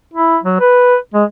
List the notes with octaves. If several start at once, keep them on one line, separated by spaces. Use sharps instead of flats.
E4
F#3
B4
G#3